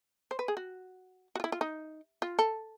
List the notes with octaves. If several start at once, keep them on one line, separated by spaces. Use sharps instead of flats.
C5
B4
G#4
F#4
F#4
F4
E4
F4
D#4
F4
A4